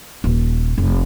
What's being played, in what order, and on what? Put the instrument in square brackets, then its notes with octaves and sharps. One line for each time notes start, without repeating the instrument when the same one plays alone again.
[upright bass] D#1
F1